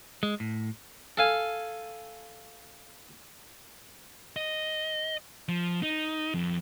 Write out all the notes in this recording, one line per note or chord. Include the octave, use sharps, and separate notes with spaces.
G#3
A2
A4 F5 G#5
D#5
F3
D#4
F2